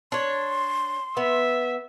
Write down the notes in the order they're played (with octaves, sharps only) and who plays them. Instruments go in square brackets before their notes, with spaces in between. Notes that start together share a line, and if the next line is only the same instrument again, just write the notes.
[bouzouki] D4 C#5 [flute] C6
[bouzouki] B3 [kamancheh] E5